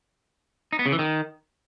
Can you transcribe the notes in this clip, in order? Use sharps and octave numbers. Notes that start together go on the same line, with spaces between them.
D#4
B3
C#3
E3
D#3